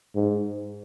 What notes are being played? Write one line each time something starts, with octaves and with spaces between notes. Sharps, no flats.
G#2